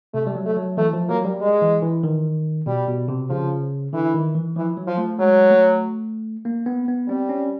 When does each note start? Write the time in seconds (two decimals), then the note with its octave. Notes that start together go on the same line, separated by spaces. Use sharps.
0.14 C3 A3
0.27 G3
0.35 F#3
0.46 A3
0.57 F#3
0.77 E3 A3
0.93 F3
1.09 F#3 A#3
1.25 G3
1.41 G#3
1.62 E3
1.83 E3
2.03 D#3
2.66 B2 G3
2.88 B2
3.08 C3
3.29 C#3 F3
3.93 D3 E3
4.14 D#3
4.35 E3
4.56 E3 F3
4.77 F#3
4.87 F3
4.98 A3
5.19 F#3 G#3
5.50 A3
6.45 A#3
6.66 B3
6.88 B3
7.08 G3 C4
7.29 C#4